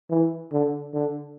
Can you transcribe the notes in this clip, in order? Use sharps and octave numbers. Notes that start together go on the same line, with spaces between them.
E3
D3
D3